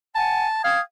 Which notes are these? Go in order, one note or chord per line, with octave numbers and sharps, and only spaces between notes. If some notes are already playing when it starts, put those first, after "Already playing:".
F#5 G#5 A5
F5 G5 D#6 G#6